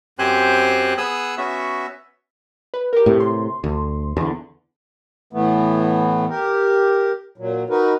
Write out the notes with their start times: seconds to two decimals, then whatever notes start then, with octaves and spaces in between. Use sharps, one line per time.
0.19 F#2 C4 G4 C5 G#5 F#6
0.98 B3 G#4 D#6 E6 F#6
1.38 B3 C#4 F#4 E5
2.74 B4
2.93 G4 A#4
3.06 A2 C3
3.20 C6
3.64 D2
4.17 E2 D3
5.33 A2 E3 A3 B3
6.29 G4 A#4
7.38 A#2 F#3
7.70 D#4 F#4 A#4 B4